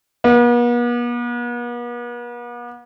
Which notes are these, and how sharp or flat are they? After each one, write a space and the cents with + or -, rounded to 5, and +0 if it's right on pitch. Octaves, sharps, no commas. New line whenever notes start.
B3 -45